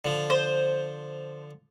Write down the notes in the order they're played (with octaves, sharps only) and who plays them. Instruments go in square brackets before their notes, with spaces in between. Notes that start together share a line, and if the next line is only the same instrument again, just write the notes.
[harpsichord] D3 F3
[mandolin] C5